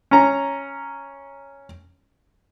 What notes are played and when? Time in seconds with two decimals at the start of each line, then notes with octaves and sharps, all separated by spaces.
0.11 C#4 A#5